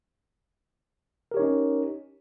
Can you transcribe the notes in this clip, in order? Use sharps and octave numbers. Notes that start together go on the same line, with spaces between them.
C#4 D#4 G4 A#4 C#5